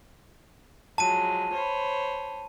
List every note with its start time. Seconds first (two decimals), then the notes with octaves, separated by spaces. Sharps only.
0.98 F3 F#3 G#3 A5 D#7
1.52 C5 C#5 B5